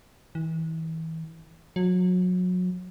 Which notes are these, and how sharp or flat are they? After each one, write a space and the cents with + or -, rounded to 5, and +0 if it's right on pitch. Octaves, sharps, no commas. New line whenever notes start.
E3 -35
F#3 -30